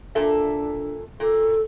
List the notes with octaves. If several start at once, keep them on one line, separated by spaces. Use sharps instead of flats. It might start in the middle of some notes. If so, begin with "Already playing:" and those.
A#2 D4 A4 E5
A#2 A4